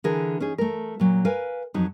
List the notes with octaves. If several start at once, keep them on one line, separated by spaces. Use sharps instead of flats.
D3 E3 G#4 A#4
C#4 D#4 G#4
A3 A#4
A#2 F#3
A#4 B4 F5 G#5
F2 F#3 D#4